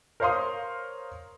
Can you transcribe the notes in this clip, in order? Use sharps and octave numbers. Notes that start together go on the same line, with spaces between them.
A#4 C5 C#5 F5 C6 D#6